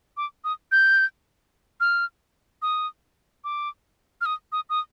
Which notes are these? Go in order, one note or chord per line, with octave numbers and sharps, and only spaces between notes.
D6
D#6
G6
F6
D#6
D6
F6
D#6
D#6
D#6